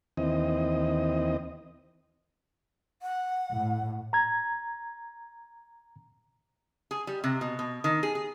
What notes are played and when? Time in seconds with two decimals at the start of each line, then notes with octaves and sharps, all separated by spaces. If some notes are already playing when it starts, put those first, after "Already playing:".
0.17 D#2 E3 C4 D#5
3.02 F#5
3.52 A2
4.13 A#5 G#6
6.91 G#4
7.07 G3
7.24 C3
7.41 B2
7.59 B2
7.84 D#3
8.03 G#4
8.15 G#4